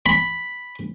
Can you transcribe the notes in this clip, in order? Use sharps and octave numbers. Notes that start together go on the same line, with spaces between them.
B5